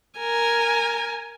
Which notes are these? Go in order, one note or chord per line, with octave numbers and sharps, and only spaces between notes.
A#4 G#5